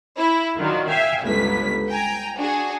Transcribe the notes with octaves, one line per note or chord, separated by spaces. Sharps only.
E4
D#3 F#3 D4 F4
E5 F5 G5 G#5
G1 C#2 B4 B6
G5 G#5 A#5
D4 F#4 G#4